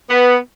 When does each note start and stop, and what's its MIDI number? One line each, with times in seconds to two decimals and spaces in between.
0.10 0.37 59